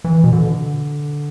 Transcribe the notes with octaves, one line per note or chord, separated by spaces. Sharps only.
E3
B2
D3